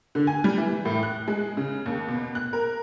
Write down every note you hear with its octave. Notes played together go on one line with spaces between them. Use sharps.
D3
G#5
G3
E3
A2
F#6
G#3
C#3
D#2
B2
F#6
A#4